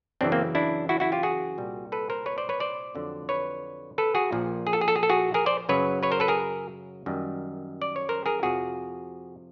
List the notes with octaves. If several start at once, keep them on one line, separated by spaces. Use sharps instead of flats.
F#2 C#3 E3 C4 D4
A#3 C4
D4 E4
E4 F#4
E4 F#4
F4 G4
F#4 G#4
C2 A#2 G3
A4 B4
A#4 C5
B4 C#5
C5 D5
B4 C#5
C5 D5
F2 D3 F#3
B4 C#5
A4 B4
F#4 G#4
A#1 A#2 F3
G#4
A4
G#4
A4
G#4
A4
F#4 G#4
G#4 A#4
C5 D5
F#2 C#3 F#3 B4 C#5
B4 C#5
A#4 C5
A4 B4
G#4 A#4
F#2 D#3 G3
D5
C#5
A#4 C5
G#4 A#4
F2 C3 F3 F#4 G#4